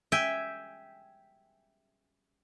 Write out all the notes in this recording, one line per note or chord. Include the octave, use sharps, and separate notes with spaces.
E5 G5 G#5